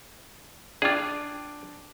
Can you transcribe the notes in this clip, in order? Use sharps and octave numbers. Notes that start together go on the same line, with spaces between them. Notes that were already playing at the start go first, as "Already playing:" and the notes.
D4 F4 G#4 G5 D6